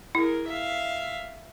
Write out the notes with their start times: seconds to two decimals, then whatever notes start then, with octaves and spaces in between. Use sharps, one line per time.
0.15 E4 G#4 A#4
0.48 E5 F5